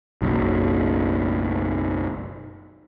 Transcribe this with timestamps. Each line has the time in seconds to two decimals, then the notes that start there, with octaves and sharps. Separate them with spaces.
0.22 F#1 B1